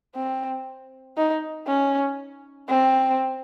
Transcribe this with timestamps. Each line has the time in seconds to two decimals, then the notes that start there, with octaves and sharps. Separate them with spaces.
0.15 C4
1.17 D#4
1.67 C#4
2.69 C4